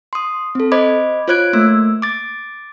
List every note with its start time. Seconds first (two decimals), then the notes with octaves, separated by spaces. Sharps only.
0.13 C6 D#6
0.55 C4 A4
0.72 C5 D#5 B5 D6 G#6
1.28 F4 C5 C#5 F#6 G#6 D7
1.53 A3 A#3 E6
2.02 D6 A6